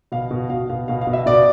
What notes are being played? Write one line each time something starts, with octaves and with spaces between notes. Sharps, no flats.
B2 F5
B2
B2 F5
B2 F5
B2 F5
F5
B2
E5
B2 D5